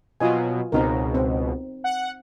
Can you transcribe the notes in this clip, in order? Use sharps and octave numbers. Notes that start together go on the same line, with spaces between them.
B2 F#3 F4 D#5 G#5
C#2 B2 C4 D#4 A#4
C4
F#5